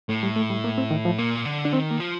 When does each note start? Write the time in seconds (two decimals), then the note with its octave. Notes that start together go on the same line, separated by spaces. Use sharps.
0.09 A2 A3
0.23 G3
0.36 A3
0.50 G3
0.64 A#3
0.78 C4
0.91 D#3
1.05 F3
1.18 A#2 A#3
1.45 D3
1.65 D4
1.73 D#3 C4
1.91 A#3
2.00 F3